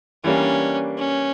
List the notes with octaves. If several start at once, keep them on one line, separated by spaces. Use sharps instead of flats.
E3 G3 A#3 C#4 D4
C#4